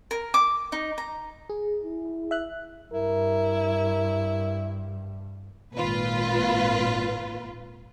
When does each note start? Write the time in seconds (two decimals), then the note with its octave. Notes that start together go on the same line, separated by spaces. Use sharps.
0.11 A#4
0.34 D6
0.72 D#4
0.98 A#5
1.50 G#4
1.84 E4
2.31 E5 F#6
2.93 G2 E4 A#4
5.75 G#1 A#2 F4 B4